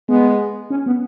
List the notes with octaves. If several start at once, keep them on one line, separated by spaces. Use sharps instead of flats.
G#3 B3
C#4
B3